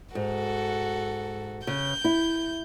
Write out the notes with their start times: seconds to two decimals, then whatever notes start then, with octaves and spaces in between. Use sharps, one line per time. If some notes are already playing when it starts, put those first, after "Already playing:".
0.15 G#2 F#4 A4
1.67 C#3 G6
2.04 E4